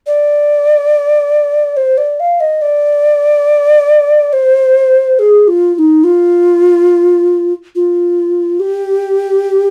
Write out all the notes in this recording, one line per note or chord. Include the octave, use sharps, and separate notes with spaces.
D5
C5
D5
F5
D#5
D5
C5
G#4
F4
F4
D#4
F4
F4
G4